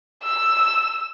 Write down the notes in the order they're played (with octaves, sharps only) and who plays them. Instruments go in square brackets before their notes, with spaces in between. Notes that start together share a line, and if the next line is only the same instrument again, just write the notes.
[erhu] E6